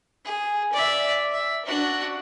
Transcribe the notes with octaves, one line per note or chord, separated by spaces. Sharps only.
G#4
D5 E5
E5
D4 F#4